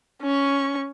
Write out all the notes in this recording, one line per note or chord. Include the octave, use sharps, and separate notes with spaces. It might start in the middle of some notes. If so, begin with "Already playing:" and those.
C#4 C#6